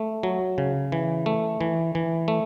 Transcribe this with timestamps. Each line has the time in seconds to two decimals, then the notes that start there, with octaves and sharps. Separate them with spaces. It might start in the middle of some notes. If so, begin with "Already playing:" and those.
Already playing: A3
0.23 F#3
0.58 C#3
0.92 E3
1.26 A3
1.61 E3
1.95 E3
2.28 A3